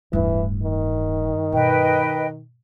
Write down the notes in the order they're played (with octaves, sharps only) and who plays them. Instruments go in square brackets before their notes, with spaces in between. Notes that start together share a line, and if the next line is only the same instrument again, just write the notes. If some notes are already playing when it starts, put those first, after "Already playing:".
[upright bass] D1 E4 [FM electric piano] G2 [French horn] E3
[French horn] D#3
[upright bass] B2 [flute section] B4 D#5 G5